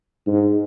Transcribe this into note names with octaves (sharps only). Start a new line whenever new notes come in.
G#2